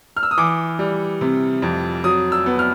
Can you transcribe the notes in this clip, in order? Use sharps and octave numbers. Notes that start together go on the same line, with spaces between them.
F6
E6
D#6
E3 D6
G3
C3
F2
F#3 D#6
E6
B3
F6